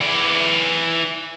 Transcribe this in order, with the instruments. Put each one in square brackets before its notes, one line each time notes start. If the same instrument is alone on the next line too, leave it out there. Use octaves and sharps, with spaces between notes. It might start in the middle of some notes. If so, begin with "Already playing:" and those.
[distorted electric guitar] E3 D5